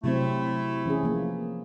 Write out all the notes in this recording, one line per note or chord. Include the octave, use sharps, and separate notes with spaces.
C3 F#3 A3 C4 E4
E3 C#4 G#4
F3 A#3